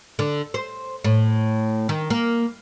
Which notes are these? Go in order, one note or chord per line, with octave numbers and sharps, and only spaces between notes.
D3
C5
A2
D#3
A#3